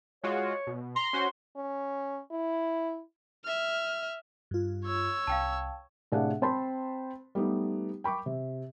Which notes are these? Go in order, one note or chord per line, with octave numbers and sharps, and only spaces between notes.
G#3 F4 F#4 C#5
B2
A#5 C6
C#4 F#4 C5
C#4
E4
E5 F6
G2 F4
C#5 E6
C2 F5 G5 A5
A2 C3 D4 G#4 F5 F#5
C4 C5 A5 B5 C6
G3 A3 B3 D#4
G5 B5 C#6 D6
C3